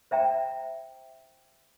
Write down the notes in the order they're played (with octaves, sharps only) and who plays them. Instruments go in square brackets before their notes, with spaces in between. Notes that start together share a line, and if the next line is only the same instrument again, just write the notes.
[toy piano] C5 E5 G5 A#5